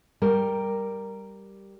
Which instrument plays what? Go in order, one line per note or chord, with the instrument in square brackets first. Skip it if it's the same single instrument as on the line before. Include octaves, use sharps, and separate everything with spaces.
[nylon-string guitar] G3 G4 A#4